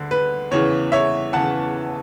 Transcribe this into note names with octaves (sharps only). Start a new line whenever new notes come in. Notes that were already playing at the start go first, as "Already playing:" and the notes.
Already playing: D2 D3
B4
E2 C#3 E3 C#5
C#5 E5
E2 C#3 E3 F#5 A5